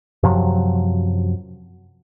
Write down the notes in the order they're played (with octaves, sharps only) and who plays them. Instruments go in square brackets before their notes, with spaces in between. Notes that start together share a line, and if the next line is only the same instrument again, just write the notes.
[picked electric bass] F#2 C3 F3 F#3